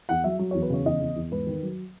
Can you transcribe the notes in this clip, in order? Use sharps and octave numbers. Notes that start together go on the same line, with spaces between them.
E2 F#5
F#3 E5
F#3
C#5
E2
B4
C#3 C#5
E2 D#5
E2
E2
G#2 B4
D#3
F#3